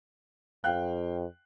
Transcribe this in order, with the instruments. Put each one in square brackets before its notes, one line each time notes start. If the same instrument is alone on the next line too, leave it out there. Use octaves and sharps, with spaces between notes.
[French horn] F2 [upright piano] F5 G5 F#6